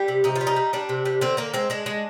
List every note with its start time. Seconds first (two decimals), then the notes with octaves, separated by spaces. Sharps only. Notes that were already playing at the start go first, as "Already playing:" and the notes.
Already playing: G3 G4
0.08 C3
0.24 C3 D#4
0.36 F4
0.41 G3
0.47 D#4
0.56 G3
0.73 G3 D4
0.89 C3
1.05 G3
1.21 D3 C4
1.37 D3 A#3
1.53 G#3 C4
1.70 G#3 D4
1.86 G#3